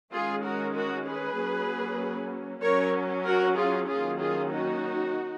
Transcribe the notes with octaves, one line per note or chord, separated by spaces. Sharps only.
D#3 G#3 C#4 F4 G#4
F#4 A#4
F#4 A#4
G#4 B4
F#3 A#3 C#4
F#3 C#4 A#4 C#5
F#4 A#4
F4 G#4
D#3 F#3 A#3 C#4 F4 G#4
F4 G#4
D#4 F#4